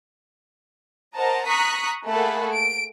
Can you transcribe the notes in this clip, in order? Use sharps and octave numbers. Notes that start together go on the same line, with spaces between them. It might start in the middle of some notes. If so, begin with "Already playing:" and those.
A#4 C5 D#5 F#5 A5 A#5
A#5 C#6 D#6 F#6 B6 C#7
A3 A#3 G#4 A4 F#5 B5
D7